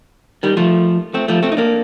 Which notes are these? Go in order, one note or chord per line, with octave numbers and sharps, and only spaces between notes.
D#3 G3
F3 A3
A3 C4
F3 A3
A3 C4
D#4
A#3 D4